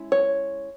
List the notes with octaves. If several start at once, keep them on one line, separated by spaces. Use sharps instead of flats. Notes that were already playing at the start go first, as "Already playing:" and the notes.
Already playing: G#3 C#4 E4
C#5